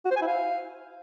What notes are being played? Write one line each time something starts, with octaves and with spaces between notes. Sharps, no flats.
F#4
C5
G#5
E4
F5